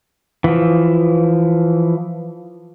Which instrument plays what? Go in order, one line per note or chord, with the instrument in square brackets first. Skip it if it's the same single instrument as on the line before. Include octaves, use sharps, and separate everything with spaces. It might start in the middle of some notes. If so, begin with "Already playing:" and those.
[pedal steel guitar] E3 F3